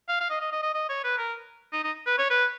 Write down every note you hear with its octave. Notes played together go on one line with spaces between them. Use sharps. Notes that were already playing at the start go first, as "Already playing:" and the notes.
F5
F5
D#5
D#5
D#5
D#5
D#5
C#5
B4
A#4
D#4
D#4
B4
C#5
B4